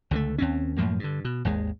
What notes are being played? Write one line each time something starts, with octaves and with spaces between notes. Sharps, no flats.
C#2 D3 G3 A3
D#2 C4 C#4
F#2 A2 F3 A#3
G2 D3
B2
G#1 D#2 G#3